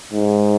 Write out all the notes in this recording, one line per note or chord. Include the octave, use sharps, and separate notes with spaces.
G#2